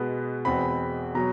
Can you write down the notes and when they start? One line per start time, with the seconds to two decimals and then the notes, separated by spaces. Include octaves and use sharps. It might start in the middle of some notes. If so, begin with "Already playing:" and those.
Already playing: B2 G#3 B3
0.45 E2 B2 G#3 C4 B5
1.15 B2 F#3 A#5